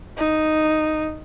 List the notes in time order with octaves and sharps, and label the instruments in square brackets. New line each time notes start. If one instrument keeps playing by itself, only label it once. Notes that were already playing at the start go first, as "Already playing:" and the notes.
[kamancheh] D#4